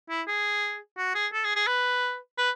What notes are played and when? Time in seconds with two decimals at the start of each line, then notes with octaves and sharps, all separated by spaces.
0.10 E4
0.28 G#4
0.98 F#4
1.15 G#4
1.33 A4
1.44 G#4
1.56 G#4
1.67 B4
2.38 B4